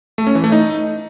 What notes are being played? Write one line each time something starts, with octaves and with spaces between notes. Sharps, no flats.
A3
C#4
E3
A3
D#4